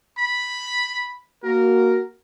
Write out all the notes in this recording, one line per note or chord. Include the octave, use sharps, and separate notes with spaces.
B5
A#3 F#4 A#4